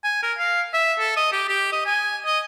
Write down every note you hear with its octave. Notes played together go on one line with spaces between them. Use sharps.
G#5
A#4
F5
E5
A4
D#5
G4
G4
D#5
G#5
D#5